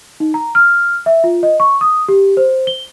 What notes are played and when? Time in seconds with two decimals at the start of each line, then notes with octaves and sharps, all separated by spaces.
0.20 D#4
0.34 A#5
0.55 F6
1.06 E5
1.24 F4
1.43 D#5
1.60 C#6
1.81 D#6
2.08 G4
2.37 C5
2.67 G7